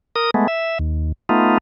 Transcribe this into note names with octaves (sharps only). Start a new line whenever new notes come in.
A#4 D#6
G#3 A3 B3
E5
D#2
A3 B3 D#4 F4